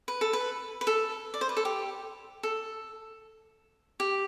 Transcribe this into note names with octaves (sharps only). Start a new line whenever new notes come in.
B4
A4
B4
B4
A4
D5
C5
B4
A4
G4
A4
G4